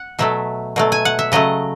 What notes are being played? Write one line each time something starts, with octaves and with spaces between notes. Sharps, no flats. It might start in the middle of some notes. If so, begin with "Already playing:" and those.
Already playing: F#5
B2 F#3 A3 E5
B2 F#3 A3
G#5
F#5
E5
C#3 F#3 A3 D#5